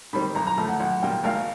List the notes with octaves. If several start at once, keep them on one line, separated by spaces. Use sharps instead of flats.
D#3 G3 C4 B5
B1 A#5
A#5
A2 F3 A3 A5
F#5
B1 F#5
A#2 G3 G5
G#1 F5